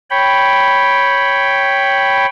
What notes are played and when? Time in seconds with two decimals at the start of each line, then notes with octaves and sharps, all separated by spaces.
0.10 C#5 G5 B5